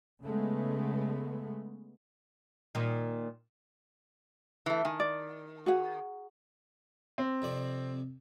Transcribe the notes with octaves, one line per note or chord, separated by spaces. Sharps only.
C#3 G#3 A3 B3
A#2 D#3
E3 A3
D#3 G#5
D5
F#4 G#4 F#5
C4
F2 C3 D5